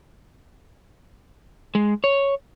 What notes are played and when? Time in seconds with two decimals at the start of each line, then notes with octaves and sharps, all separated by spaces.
1.75 G#3
2.04 C#5